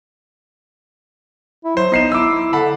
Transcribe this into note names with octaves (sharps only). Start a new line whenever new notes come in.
E4
F#3 C5
B3 D#4 C7 E7
E4 D6 E6
D3 F#5 A5 B5